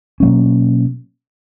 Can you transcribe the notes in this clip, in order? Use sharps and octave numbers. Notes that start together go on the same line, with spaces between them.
B2 F#3 A#3 C#4